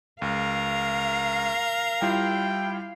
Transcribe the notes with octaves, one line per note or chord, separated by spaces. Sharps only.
C#2 A#4 F5
G3 E4 F4 G5